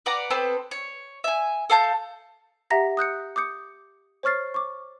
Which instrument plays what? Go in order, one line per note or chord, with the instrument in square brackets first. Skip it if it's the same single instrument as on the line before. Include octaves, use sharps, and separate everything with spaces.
[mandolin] B4 D5 F#5 A#5
B3 C4 A4 B4
C#5
E5 G#5
A4 F5 A5 G6
[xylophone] G4 E5 F#5 A#5 A#6 B6
D#6 F#6 G6 C#7
D6 D#6 G6 C#7
C5 C#5 C#6 F6 A6 C7
C#6 D6